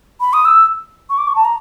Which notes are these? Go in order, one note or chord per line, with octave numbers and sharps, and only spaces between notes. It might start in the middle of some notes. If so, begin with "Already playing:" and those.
B5
D#6
E6
C#6
D6
C#6
A5
A#5